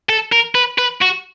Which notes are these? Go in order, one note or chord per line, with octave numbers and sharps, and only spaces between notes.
A4
A#4
B4
B4
F#4